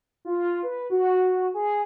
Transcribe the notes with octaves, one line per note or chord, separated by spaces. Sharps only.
F4
B4
F#4
G#4